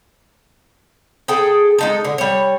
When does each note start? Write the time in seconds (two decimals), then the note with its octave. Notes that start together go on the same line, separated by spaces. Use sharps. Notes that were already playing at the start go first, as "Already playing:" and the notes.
1.28 G#4 A4 G5
1.78 G#3 D#4 A4
2.04 D3
2.18 G3 C#5